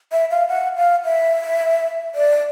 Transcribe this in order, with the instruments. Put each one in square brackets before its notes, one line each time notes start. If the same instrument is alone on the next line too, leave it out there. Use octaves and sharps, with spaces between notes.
[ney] E5
F5
F#5
F5
E5
D5